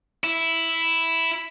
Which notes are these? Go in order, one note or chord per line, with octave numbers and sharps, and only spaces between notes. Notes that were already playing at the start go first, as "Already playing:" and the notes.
E4